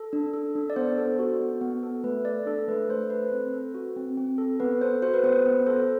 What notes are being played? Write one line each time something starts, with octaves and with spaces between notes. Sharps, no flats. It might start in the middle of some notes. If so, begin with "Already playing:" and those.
Already playing: A4
D4
A4
D4
D5
B3 C5
A4
F#4
B3
B3
A4
A3 B4
A4 D5
D4 A4
A3 B4
A3 C5
A4 B4
C4
A4
F#4
C4
C4
A4
B3 B4
A4 C5
F#4 C5
B4
B3 C5
B3 B4
A4 C5